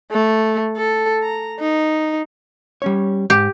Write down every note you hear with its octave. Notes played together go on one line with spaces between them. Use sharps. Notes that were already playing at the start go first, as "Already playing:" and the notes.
A3
A4
A#5
D#4
G3 C#4 C#5
G#2 G4